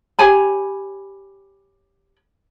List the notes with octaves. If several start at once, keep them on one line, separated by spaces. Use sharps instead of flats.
G4 C#5 G#5 B5